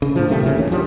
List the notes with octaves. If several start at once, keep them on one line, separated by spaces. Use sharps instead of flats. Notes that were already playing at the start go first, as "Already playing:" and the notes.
C#3
A2 D3 F3
C3 D#3 G3 A3
F#1 A2 C#3 A#3
E1 A1 D#3 C#4
G2 F3 G3